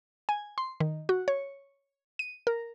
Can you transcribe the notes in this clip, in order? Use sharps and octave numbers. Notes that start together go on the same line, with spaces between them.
G#5
C6
D#3
F#4
C#5
D#7
A#4